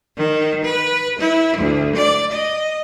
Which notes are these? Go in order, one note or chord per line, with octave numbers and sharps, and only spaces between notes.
D#3
B4
E4
D2
D5
D#5